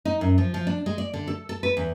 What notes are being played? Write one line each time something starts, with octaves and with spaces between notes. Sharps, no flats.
D#4
F#2
F3
F3
D4
G#3
D5
D3
A4
A4
B4
E2